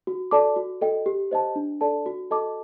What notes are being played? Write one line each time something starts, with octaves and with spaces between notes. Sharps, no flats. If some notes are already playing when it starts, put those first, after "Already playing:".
F#4
A4 D5 A5 D6
F#4
A4 D#5 G5
G4
C5 D#5 A5
D4
A4 D5 A5
F#4
A4 D#5 A5 D6